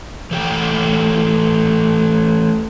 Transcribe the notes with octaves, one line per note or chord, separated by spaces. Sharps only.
E3 A3 G4 F#5 G5